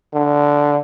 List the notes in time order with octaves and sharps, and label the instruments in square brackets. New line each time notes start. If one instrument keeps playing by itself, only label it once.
[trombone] D3